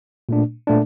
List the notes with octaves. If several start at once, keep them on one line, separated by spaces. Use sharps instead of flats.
A#2 A3 D4
A#2 A3 D4